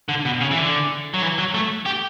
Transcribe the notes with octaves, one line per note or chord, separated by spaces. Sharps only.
D3
B2
C#3
E3
D3
F#3
E3
F#3
A3
G4